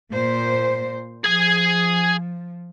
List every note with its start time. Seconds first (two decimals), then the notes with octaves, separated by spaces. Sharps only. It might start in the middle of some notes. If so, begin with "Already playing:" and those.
0.12 A#2 C5
1.24 F3 G#4 G#5